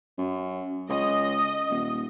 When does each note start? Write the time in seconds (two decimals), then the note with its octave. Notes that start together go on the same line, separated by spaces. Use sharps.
0.18 F#2
0.89 C#2 D#5
1.70 D#1